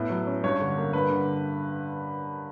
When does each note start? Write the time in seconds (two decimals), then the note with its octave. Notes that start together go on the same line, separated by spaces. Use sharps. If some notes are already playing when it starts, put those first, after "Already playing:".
Already playing: A2 B3
0.10 F#3
0.27 C#4
0.44 G2 C#5
0.61 D3
0.78 A#3
0.93 G2 B4
1.10 D3